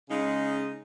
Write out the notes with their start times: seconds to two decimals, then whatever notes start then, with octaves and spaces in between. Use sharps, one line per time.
0.09 C#3 G#3 D#4